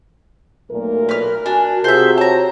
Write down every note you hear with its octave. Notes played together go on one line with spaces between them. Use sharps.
B1 A#2 A3 A#4
B4 F6
D4 F#4 G#5
C3 F4 F#4 G#4 C5 E5
C#5 A5 A#5